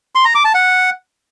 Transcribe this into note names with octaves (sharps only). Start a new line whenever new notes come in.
C6
A#5
D6
A5
F#5